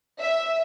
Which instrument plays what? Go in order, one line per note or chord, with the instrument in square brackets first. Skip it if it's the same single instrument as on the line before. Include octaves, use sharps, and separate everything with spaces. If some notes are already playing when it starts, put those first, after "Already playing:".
[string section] E5